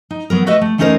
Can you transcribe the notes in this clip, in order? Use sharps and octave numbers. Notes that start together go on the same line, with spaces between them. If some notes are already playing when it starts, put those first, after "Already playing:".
D#4
F#3 B3 A#4
A3 F#4 B4 D#5 E5
A3
E2 A3 C#4 D#4 A#4 C5